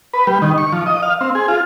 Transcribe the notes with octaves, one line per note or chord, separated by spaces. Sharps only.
B4
G3
D#3
C#6
F3
D#5
F5
C4
G#4
F4